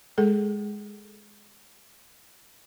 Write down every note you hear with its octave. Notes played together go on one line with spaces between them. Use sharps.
G#3 G#4 A4